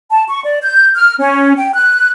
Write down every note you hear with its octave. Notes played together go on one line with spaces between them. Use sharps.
A5
C#6
D5
G6
F6
C#4
G5
F#6